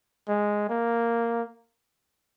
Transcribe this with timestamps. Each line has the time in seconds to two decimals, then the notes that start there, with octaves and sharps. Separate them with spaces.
0.28 G#3
0.69 A#3